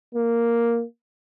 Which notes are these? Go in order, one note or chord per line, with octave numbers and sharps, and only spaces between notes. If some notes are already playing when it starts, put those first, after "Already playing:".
A#3